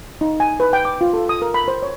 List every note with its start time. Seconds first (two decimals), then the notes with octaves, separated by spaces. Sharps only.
0.21 D#4
0.40 G#5
0.60 B4
0.73 G5
0.85 D6
1.01 F4
1.14 A4
1.29 D#6
1.42 A#4
1.54 B5
1.68 C5
1.83 C#5